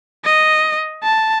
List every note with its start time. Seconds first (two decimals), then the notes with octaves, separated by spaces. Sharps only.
0.25 D#5
1.04 A5